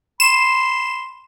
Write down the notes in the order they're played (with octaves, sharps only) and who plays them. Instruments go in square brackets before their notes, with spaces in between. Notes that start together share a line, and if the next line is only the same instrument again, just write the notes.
[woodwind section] B5 C6 [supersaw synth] E7